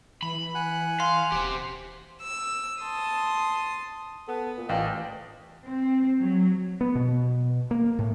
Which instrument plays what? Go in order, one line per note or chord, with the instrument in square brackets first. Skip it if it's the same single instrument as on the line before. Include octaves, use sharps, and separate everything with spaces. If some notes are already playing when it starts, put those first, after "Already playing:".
[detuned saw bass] E3 [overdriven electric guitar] B5
[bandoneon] F#5 G#5 F#6
[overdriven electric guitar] F5 [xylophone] C6
[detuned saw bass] D#1 [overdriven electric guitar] G4 C5
[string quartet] E6
A5 C6 D#6
[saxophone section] B3 [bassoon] A4
[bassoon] A#2
[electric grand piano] A1 G5 [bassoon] F4 [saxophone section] D5 D#5
[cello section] C4
F#3
[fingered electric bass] B3
B2
A#3
A2